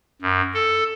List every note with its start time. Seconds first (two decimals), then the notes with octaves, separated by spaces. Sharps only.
0.22 F#2
0.54 A4